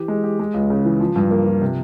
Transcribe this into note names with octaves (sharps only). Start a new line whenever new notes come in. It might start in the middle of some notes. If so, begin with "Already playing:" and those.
Already playing: E3 G4
G#3
G4
G#3
C#2
C#3
E3
F3
G2
A#3
F3
C3